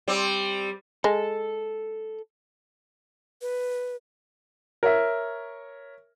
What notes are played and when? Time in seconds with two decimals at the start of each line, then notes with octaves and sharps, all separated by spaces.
0.08 G3 C4
1.04 G#3 A4
3.41 B4
4.83 A#4 C#5 E5